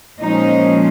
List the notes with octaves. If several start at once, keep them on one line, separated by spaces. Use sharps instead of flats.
A#2 F3 G#3 C#4 D#4